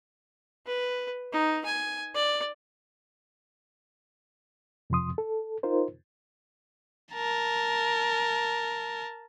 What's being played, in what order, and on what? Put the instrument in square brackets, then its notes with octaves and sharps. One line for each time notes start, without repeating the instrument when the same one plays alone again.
[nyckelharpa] B4
D#4
G#5
D5
[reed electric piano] F2 C3 F3 C6 D#6
A4
D#4 F4 A#4 C5
[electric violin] A#4 A5